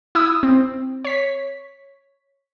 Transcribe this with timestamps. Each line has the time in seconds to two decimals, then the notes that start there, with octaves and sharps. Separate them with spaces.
0.15 E4 D#6 E6
0.43 C4
1.05 C#5 B6